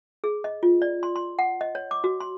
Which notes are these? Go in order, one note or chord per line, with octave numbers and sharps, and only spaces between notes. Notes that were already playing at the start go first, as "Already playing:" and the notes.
G#4
D#5
F4
D5
C6
C6
F#5
D#5
C#5
D6
F#4
C6